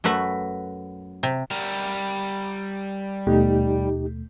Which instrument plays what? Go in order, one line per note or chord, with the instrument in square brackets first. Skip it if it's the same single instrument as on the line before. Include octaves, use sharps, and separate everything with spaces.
[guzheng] F#2 A3 F#4 B4 E5
C3
[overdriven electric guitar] G3 A#4
[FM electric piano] D#2 B2 A3 [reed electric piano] D#4 G4